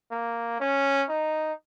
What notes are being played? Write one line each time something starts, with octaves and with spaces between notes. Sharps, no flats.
A#3
C#4
D#4